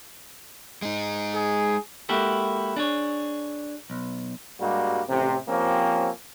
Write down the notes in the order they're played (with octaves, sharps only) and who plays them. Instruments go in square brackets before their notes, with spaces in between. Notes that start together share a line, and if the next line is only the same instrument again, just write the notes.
[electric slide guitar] G#3 D#4
[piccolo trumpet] G#4
[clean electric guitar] G#3 A#3 E4 F#4 G4 A4
D4 G#4 C#5
B1
[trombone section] G2 G3 G#3 A#3 F#4
A1 C3
F3 A#3 C4 C#4 G4